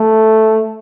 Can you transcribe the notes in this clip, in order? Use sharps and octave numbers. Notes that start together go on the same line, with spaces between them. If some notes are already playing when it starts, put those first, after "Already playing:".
Already playing: A3